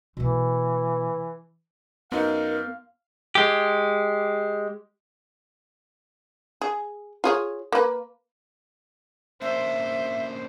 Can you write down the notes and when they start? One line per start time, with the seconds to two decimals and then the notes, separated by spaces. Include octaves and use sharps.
0.17 B2 E3 A#3
2.12 F#2 B3 D#4 A#4 F5
3.35 G#3 G4
6.62 G#4
7.24 F4 G#4 C#5
7.72 A#3 B4
9.42 A#3 C#4 D4 C5 E5